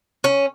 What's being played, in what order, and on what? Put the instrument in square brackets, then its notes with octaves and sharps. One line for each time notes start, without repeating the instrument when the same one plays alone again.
[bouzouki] C#4